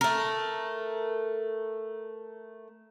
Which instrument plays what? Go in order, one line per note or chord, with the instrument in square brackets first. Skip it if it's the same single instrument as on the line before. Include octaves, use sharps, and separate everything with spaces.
[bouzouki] A3 A#4